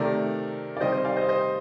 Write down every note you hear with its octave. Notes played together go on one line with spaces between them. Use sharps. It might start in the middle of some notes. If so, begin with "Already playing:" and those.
Already playing: C3 D#3 A3 A#4 D5
D5
C3 D#3 G3 C5 D#5
C5 D#5
D5 F5
C5 D#5
C5 D#5